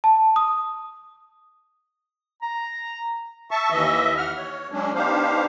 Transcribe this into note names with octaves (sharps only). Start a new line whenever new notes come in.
A5
D#6
A#5
E5 A5 C#6
D#2 E3 D#5 E5
F#5 F6
C#5
F#3 G#3 C#4 D4
B3 D4 D#4 G4 C5 F5